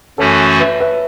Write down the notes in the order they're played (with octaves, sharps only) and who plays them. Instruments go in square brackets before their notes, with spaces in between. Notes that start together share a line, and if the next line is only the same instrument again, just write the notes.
[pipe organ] F#2 E3 A3 C#4 F#4 [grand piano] A4 C#5
[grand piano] B4 E5
B4 E5